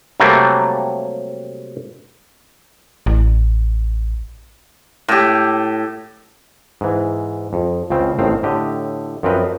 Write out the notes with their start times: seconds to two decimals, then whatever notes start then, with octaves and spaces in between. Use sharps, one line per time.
0.20 C3 F#3 G3 A3 A#3
3.06 A1
5.08 A2 G4
6.81 G#2 E3
7.53 F2
7.90 C#2 C#3 C4
8.19 A1 A2 D#3 C4 F5
8.43 A2 D3 G4 D#5
9.23 F#2 F3 C4 A#4 B4 D#5